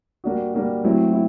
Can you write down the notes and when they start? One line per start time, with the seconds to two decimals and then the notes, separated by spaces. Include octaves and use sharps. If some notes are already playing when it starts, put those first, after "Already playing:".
0.24 G3 A#3 D4 F#4
0.54 G3 A#3 D4 F#4
0.84 F#3 A3 C4 E4
1.13 E4